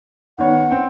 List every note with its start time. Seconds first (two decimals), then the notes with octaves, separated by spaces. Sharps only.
0.38 D#3 B3 C#5 F#5
0.71 C4 G5